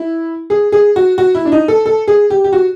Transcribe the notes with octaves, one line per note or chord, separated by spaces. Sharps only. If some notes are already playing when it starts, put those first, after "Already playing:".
Already playing: E4
G#4
G#4
F#4
F#4
E4
D4
D#4
A4
A4
G#4
G4
G4
F#4